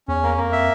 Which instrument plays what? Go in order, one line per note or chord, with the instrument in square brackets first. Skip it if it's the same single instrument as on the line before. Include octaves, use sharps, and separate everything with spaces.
[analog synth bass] E2 [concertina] C#4
[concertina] A#3
[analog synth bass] F2 [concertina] A#3
[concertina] E5